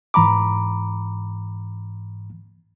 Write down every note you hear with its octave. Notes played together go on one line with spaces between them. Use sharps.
G#2 E3 A#5 B5 D6